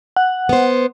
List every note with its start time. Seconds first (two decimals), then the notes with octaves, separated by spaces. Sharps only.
0.16 F#5
0.49 B3 C5